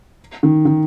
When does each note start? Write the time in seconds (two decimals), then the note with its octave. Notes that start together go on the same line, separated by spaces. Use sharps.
0.43 D#3
0.65 D#3